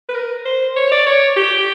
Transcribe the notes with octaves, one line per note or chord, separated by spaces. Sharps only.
B4
A#4
C5
C#5
D5
C#5
G4